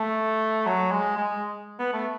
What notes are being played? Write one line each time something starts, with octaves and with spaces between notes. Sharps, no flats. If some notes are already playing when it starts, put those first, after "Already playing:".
Already playing: A3
F#3
G#3
G#3
B3
A3